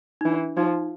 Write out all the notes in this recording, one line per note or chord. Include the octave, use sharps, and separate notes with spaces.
D#4
E3 D4
F3 D#4